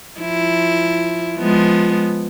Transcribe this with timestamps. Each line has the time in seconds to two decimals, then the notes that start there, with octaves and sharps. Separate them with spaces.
0.20 F3 E4
1.39 F3 G#3 B3